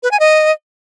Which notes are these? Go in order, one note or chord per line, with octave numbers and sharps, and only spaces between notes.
B4
G#5
D#5